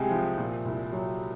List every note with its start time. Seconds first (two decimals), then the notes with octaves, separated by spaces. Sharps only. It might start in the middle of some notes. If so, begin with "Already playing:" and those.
Already playing: C2 C3 G#3 G5 G#5
0.11 F3
0.38 A#2
0.65 C2
0.92 F#3